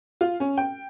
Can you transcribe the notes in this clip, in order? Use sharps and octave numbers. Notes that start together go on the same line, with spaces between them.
F4
C#4
G5